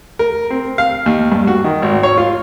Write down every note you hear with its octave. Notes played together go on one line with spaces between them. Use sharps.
A#4
C4
F5
D#2
G2
F#4
D#3
G#1
C#5
F4